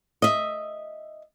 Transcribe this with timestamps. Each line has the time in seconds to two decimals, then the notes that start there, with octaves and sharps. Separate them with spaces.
0.22 D#5 E5